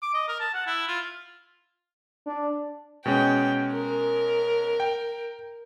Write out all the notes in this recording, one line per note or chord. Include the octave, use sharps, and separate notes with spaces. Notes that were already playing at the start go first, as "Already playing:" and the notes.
D6
D#5
A#4
A5
F#5
E4
F4
D4
B2 G#3 C#4 G5
A#4
G5